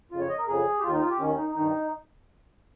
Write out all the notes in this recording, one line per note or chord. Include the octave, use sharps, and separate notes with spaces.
F2 C#3 F4
C#5
D#5
A#4
F2 C#3 G#4
G4
D#2 D#3 F4
D#4
F4
G4
D#2 D#3 C#4
D#4
G2 D#3 D#4